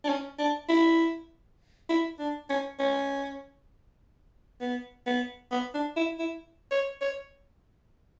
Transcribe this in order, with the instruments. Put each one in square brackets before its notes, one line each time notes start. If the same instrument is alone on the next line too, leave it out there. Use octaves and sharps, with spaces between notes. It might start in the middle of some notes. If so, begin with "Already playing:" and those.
[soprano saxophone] D4
C#4
D4
E4
E4
D4
C#4
C#4
B3
B3
B3
D4
E4
E4
C#5
C#5